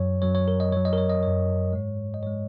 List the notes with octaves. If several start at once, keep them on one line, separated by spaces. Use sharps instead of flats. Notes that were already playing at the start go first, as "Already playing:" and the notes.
Already playing: F#2 F#3 C#5
F#2 F#3 C#5
C#5
A#4
D#5
F#2 F#3 C#5
D#5
A#4
C#5
D#5
F#2 F#3 C#5
G#2 G#3
D#5
G#2 G#3 C#5